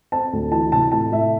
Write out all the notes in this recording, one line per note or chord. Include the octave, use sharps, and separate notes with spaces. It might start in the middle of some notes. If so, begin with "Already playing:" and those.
C4 A5
D2
E3 A5
C3 A5
A2 A5
A2 E5